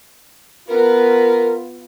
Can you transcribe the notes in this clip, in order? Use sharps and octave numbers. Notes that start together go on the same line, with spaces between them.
B3 F4 A#4